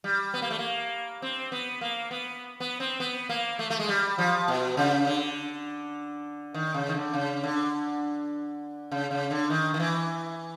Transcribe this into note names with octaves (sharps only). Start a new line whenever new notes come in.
G3
B3
A#3
A3
A#3
C4
B3
A#3
B3
B3
C4
B3
A#3
A3
A3
G#3
G3
F3
B2
C#3
D3
D#3
C#3
D#3
D3
C#3
D3
C#3
C#3
D3
D#3
D#3
E3